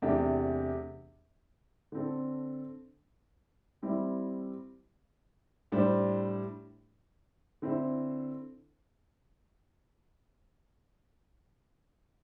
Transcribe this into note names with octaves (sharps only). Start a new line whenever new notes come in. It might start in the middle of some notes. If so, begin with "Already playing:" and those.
E2 C3 A3 D4 G4
D3 C4 A4
E3 G3 C4 E4
A2 G3 D4 C5
D3 C4 E4 C5